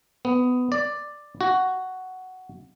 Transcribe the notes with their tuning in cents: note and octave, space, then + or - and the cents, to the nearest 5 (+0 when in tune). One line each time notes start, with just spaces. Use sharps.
B3 +20
D5 +5
F#4 +5